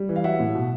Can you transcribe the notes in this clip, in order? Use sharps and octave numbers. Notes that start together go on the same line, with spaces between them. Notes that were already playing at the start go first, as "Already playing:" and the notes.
Already playing: G3
E3
F5
F#3 E5 F#5
A2
B2